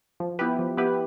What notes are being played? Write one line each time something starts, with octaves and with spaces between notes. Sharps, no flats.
F3
B3 E4 G4 B4
F3
B3 E4 G4 B4